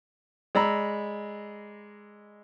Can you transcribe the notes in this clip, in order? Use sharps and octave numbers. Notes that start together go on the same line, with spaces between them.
G#3 D5 A#5 B5 E6